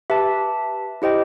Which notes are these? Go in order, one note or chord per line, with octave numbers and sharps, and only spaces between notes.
G4 B4 E5 A5
E4 G4 C5 D#5 G5